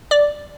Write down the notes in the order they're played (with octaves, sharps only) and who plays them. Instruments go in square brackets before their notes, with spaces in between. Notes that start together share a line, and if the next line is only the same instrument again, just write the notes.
[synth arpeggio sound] D5